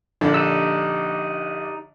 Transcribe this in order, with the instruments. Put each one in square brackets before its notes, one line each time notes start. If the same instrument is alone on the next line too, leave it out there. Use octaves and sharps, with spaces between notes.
[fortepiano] A#1 D3
[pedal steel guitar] D#4 G4 E6